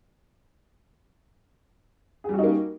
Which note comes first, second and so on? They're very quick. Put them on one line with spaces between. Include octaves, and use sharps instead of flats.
G#4 G3 F#4 D#4 A#3